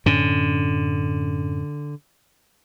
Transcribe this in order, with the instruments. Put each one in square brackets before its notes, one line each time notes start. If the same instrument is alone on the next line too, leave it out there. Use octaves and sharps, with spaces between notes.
[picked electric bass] F#2 A2 C#4 [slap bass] D3